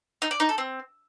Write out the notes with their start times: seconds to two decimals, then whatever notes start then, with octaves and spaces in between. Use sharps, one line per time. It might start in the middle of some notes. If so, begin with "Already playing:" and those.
0.22 D#4
0.31 D5
0.40 D#4
0.49 A4
0.58 C4